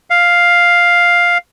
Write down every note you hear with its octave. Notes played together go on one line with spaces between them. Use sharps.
F5